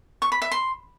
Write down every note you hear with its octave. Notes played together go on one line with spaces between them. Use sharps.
C#6
B5
E5
C6